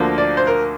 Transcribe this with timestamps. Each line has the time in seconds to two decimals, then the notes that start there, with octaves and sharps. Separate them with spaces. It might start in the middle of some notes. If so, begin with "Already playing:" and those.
Already playing: D2 D3 F3 A#3
0.18 D5
0.37 C5
0.47 A#4